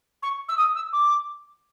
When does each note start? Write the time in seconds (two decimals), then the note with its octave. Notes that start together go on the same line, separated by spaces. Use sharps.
0.23 C#6
0.49 E6
0.58 D#6
0.75 E6
0.93 D6